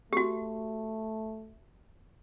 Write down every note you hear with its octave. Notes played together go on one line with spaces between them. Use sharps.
A3 F#4 G4